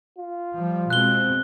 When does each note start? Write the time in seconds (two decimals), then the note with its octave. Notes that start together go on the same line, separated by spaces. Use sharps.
0.18 F4
0.56 F3 G3
0.90 B2 G#3 C4 F#6 G7